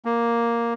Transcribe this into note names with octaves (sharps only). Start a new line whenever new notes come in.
A#3